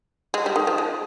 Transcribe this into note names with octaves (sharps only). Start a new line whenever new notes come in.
G#3
G3
D#3
F3
G#3